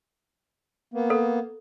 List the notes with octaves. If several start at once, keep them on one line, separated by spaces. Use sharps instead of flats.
A#3 B3
A4